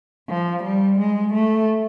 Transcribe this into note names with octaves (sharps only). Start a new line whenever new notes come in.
F3
G3
G#3
A3